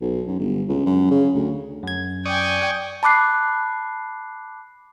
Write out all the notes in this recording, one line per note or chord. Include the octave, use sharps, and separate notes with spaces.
B1
F#2
G1
C#2
F#2
C#3
D2
F#2 G#6
D5 G5 G#5 C#6 D#6
A5 B5 D6 F#6 C7